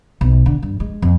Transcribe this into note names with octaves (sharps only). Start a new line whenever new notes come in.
B1
D3
G2
G#3
F2